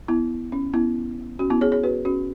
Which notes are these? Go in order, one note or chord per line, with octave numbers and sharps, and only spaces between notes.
B3 E4
C#4
B3 E4
C#4 F#4
B3 E4
G#4 C#5
G#4 C#5
F#4 B4
C#4 F#4